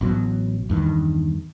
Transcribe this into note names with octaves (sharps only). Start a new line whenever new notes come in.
A1 B2 E3 F#3
E2 G2 D#3